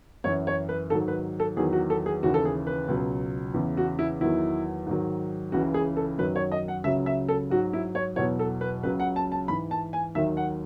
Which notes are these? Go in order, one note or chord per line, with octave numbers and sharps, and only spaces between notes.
F#2 E3 C#5
C#5
B4
G#2 D#3 F#3 A4
B4
A4
E2 D#3 F#3 G#4
F#4
A4
G#4
D#2 C#3 E3 F#4
A4
G#4
B4
C#2 B2 F#3
E2 C#3 E3
F#4
E4
E2 D#3 F#3 E4
G#2 D#3 F#3
C#2 C#3 E3 F#4
G#4
A4
F#2 D#3 F#3 B4
C#5
D#5
F#5
C#2 C#3 F#3 E5
E5
A4
G#2 F#3 F#4
E4
C#5
E2 B2 F#3 C#5
A4
B4
C#2 C#3 F#3 B4
F#5
A5
A5
G#2 E3 B5
A5
G#5
D#2 D#3 F#3 E5
F#5